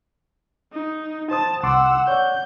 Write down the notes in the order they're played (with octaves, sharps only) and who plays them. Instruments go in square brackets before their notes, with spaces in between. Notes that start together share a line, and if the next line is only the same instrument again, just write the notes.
[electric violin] D#4
[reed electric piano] C5 D#6 [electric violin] A5
[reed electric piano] C2 C6 D6 [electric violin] F#5 E6
[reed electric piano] C#5 D5 F#5 [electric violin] G6